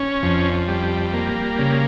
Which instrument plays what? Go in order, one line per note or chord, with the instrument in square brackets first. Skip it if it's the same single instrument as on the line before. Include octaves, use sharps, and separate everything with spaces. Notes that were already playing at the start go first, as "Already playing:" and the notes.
Already playing: [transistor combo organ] C#4
F2
G3
A#3
C#3